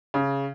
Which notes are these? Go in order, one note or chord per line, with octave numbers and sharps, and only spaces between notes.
C#3